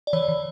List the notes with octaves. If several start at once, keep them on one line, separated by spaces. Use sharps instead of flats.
D5
E3 C#5
E3